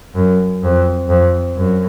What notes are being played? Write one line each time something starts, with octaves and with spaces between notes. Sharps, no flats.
F#2
F2
F2
F#2